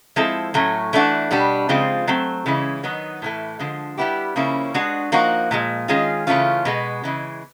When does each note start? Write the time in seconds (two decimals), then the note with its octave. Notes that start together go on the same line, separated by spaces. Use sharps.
0.16 F3 G#3 C4 E4 A4
0.54 A2 F#3 A3 C#4
0.93 E3 A3 D4 F#4
1.31 B2 G3 B3 D4
1.69 C#3 F3 G#3 C4 F4
2.07 F#3 A3 C4
2.46 C#3 E3 G#3 C#4 E4
2.83 D#3 F#3 B3 D#4
3.22 A2 E3 A3
3.59 D3 F3 G#3
3.98 G3 B3 E4 G4
4.36 C#3 F3 A#3 C#4 E4
4.74 G#3 B3 D4 F#4
5.12 F3 A#3 D#4 F#4
5.51 A#2 F3 G#3
5.88 D#3 G#3 C#4 F4 G#4
6.27 C#3 E3 A3 C#4 F4
6.65 B2 G#3 B3
7.04 C#3 E3 G#3